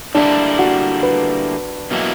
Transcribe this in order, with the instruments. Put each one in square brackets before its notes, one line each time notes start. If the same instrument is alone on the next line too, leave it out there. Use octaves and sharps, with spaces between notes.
[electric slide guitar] D3 G3 A#3 E4 [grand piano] D4
[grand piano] F#4
B4
[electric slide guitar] B2 F#3 A#3 E4